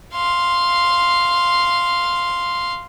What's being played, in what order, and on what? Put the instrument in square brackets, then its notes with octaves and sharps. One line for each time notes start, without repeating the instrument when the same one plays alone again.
[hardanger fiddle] F5 C6